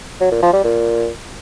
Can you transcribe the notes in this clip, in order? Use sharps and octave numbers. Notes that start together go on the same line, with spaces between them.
F#3
A#2
F3
G3
A#2